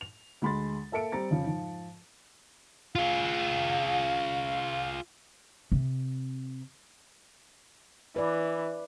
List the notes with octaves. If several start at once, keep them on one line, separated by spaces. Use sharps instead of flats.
F7
D2 G#3 B5 C6 A6
A#3 A4 E5 C#7 D7
G3 C4 A#5 A6
F2 C#3 F3
G#2 F3
F4 G#4 F5
C3
E3 B4 D5